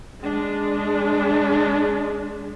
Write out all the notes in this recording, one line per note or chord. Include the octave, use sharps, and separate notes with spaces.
G#3 D4